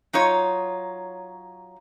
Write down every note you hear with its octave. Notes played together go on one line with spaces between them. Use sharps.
F#3 D#4 F4 C#5